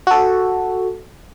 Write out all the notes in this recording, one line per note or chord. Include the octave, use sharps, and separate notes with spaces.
F#4 A4